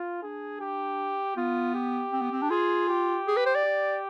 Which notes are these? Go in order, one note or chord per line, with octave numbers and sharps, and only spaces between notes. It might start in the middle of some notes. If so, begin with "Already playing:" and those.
Already playing: F4
D4 G#4
G4
B3 F4
G4
C4
B3
C4
D4
F4 G#4
G4
G#4
B4
C5
D5
G4